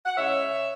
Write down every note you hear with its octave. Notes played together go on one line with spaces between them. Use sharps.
F#5
C#3 G#3 C#4 C#5 E5